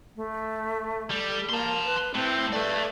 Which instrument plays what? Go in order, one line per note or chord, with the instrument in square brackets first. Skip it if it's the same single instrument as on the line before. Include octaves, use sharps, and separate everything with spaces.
[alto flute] A3
[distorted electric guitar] G3 [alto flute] A4
[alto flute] A#3 [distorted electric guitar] A5 C6
[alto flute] B4
[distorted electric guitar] A2 [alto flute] C4
[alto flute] A3 [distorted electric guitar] B4 D5